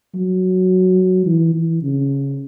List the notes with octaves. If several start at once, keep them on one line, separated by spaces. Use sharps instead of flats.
F#3
E3
E3
C#3